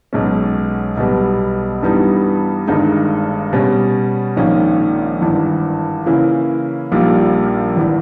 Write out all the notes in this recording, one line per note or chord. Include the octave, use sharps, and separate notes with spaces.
B1 B2 G#3 C#4
B1 B2 G3 B3
G2 E3 G3 B3 D#4
G1 G2 D#3 G#3 D#4
B2 G3 C#4
A#1 G#2 D#3 A#3 C#4
G#1 G2 E3
C#3 E3 A#3 C#4 E4
A#1 A#2 G3 A#3 D#4
G#1 E3